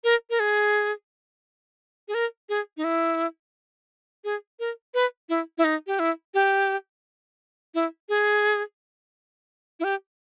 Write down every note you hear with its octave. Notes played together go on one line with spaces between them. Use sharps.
A#4
A#4
G#4
G#4
A#4
G#4
D#4
E4
G#4
A#4
B4
E4
E4
D#4
G4
E4
G4
E4
G#4
E4
G4